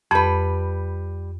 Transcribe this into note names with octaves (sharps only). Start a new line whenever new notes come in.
F2 G3 B4